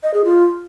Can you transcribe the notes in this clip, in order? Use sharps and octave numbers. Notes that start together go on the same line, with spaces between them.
D#5
G#4
F4